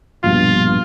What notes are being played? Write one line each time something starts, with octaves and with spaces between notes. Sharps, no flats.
A#1 G2 B2 F4